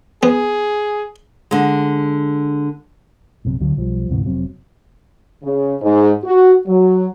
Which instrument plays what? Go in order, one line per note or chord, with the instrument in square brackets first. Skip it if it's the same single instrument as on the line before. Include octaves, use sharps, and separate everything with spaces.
[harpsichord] B3 [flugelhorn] G#4
[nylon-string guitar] D3 G#3
[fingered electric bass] A#1 F#2 C3
D2 D3 F#3
B1 F3 G3
D2 G#2 C3 E3
F1 F#3 C4
[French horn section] C#3
G#2
F#4
F#3